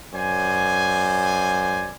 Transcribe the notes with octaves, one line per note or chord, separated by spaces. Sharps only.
F#2 C5 D5 G#5